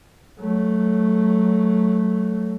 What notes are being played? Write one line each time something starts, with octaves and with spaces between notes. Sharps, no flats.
F#3 A3